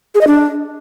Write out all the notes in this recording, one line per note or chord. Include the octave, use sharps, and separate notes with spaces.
G#4
D#5
D4